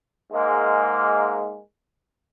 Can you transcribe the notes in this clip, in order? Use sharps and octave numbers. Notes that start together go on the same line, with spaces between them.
G#2 G#3 A#3